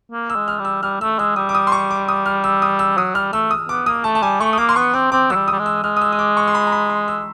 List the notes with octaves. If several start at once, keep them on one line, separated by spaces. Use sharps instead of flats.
A#3
E6
G#3
F6
G3
E6
G3 F6
A3 E6
G#3 E6
G3 D#6
D6
D#6
C6
C#6
D6
D#6
F6
E6
D#6
E6
F#3 D#6
G3 F6
A3 E6
D#6
B3 D6
A#3 D#6
A3 A5
A5
G3 G#5
A3 C#6
D#6
A#3 D6
C6
B3 C#6
C4 D6
C4 D6
F#3 E6
G3
G3 D#6
G#3
E6
G#3 F6
D#6
E6
D#6
D6
C#6
C6
B5
A#5
B5
C6
E6